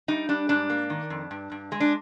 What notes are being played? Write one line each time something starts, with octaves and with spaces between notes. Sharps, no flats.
G3 D#4
G3 D4
G#2 D4
A#3
D#3
F2
G2
G2
G#3
D4